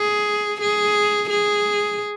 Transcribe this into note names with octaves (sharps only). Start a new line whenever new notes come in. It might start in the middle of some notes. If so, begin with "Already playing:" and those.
Already playing: G#4
G#4
G#4